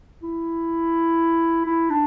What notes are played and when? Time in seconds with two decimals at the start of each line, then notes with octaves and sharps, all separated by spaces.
0.23 E4
1.66 E4
1.90 D4